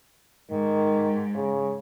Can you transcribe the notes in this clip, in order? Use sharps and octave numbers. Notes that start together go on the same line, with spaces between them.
G#2 D#3
C#3